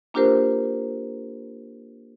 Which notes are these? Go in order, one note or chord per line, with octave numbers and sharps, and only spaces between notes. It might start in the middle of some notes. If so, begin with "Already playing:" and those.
A#3 D4 F4 G4 A#4 C5